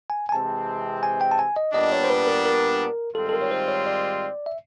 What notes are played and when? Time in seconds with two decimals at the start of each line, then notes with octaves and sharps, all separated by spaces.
0.10 G#5
0.29 G#5
0.32 C3 E3 G#3 C4 A5
1.03 G#5
1.21 G5
1.32 A5
1.39 G#5
1.56 D#5
1.74 A#2 G3 B3 D4 D#5
1.92 C#5
2.04 C5
2.10 B4
2.27 A#4
2.45 A#4
3.15 G#2 D#3 G3 C4 F4 A4
3.29 A4
3.33 A#4
3.42 C#5
3.51 C5
3.68 C#5
3.87 D5
4.46 E5